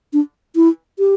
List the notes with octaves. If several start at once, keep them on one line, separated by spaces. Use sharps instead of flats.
D4
E4
G4